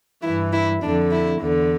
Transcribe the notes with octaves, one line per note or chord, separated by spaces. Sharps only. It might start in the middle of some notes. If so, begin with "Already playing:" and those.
G2 E3 E4
E4
F2 D3 D4
E4
E2 D3